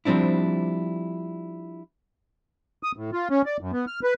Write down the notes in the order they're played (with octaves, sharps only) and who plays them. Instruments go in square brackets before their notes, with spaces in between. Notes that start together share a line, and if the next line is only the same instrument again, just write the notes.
[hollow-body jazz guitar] F3 G3 C4 D4 E4
[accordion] D#6
A2
F4
C#4
D5
F#2
B3
F6
B4